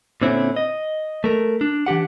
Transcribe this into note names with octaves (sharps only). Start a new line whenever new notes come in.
A#2 D3 C4 C#4 E4
D#5
A3 A#4
D4
E3 D4 G4 F#5